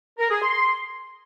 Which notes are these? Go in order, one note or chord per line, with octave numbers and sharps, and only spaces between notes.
A#4
G#4
C6